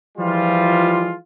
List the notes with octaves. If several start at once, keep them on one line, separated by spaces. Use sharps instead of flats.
E3 F3 G3 G#3 F4